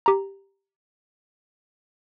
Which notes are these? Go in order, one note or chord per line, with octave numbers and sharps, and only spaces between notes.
G4 A#5